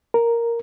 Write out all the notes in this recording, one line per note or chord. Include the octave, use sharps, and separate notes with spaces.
A#4